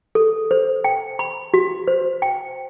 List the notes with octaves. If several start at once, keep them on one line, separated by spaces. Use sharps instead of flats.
A4
C5
G5
B5
F#4
C5
G5